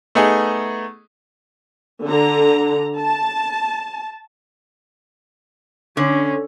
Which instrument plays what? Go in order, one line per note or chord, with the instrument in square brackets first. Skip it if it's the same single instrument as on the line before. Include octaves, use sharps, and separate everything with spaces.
[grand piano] A3 B3 D#4 G#4
[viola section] D3 A#5
A5
[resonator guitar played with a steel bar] D3 [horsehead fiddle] C#4